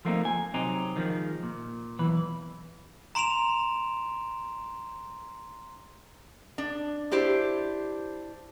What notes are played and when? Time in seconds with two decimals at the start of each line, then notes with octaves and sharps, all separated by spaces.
0.05 F3 A3 A#3 C4 D#4
0.25 G#5
0.54 C3 F#3 C4 D#4
0.96 D#3 F3 G#3
1.43 A#2
1.99 B1 E2 E3 B4
3.15 A#5 C6 D7 E7 F7
6.58 D4
7.11 D4 E4 G4 C5